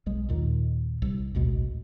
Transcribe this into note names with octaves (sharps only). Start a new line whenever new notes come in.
B1 G#3
D#2 A#2 D#3
C2
A1 D2 B2 G#3